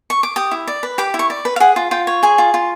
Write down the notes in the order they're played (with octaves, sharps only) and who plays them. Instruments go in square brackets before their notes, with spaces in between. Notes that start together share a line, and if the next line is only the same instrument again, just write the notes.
[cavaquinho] C#6
D6
G4 D#6
E4
D5
B4
G4 D6
E4
C#6
D5
B4
F5
G#4 F#5
F4
F4 G5
C#5
G#4 G#5
F4
F4